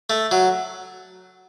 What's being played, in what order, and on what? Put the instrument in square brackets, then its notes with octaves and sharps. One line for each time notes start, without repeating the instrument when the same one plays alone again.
[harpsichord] A3
F#3